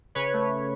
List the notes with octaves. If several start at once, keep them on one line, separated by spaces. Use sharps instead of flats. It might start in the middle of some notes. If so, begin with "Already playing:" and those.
C#3 B4 C#5
A3